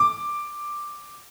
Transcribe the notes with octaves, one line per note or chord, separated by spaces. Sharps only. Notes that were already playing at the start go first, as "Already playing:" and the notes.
Already playing: D6